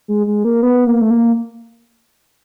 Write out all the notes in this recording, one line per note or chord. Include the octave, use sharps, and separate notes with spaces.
G#3
G#3
A#3
B3
A#3
A3
A#3